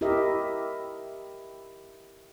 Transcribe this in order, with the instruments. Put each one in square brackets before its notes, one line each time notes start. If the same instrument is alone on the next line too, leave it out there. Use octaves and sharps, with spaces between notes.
[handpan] E4 G4 A#4 D#5 E5